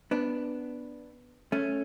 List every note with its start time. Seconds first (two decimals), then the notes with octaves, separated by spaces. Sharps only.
0.11 B3 D4
1.52 A3 C#4